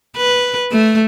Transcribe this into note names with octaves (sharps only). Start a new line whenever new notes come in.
B4
A3